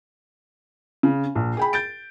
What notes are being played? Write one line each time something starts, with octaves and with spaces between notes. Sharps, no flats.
C#3
A#1
G#4 G5 B5
G6 A6 D7